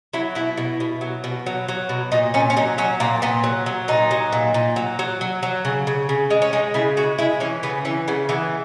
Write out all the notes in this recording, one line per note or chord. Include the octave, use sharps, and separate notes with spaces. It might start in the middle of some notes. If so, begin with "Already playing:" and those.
F#3 E4
B2 E4
B2
B2
F#3
B2
F#3
F#3
B2
A#2 D#4
A#2 C#4
C#4
F#3 D#4
F#3 C#4
A#2 A#3
A#2 B3
F#3
F#3
A#2 D#4
F#3
A#2
A#2
F#3
F#3
F#3
F#3
C#3
C#3
C#3
G#3
C#4
G#3 D#4
C#3 E4
G#3 F#4
G#3 E4
E3 C#4
C#3 B3
E3 C#4
C#3 B3
E3 B3